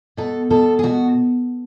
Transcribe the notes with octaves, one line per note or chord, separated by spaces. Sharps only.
B2 A4
B2 A4
G#4
B2 F#4